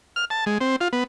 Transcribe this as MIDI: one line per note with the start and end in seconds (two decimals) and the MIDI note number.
0.16 0.25 89
0.30 0.45 81
0.46 0.58 56
0.61 0.76 60
0.81 0.88 65
0.93 1.04 59